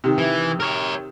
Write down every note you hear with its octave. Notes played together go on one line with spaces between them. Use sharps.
C3 D#3
E3
A#4 C#5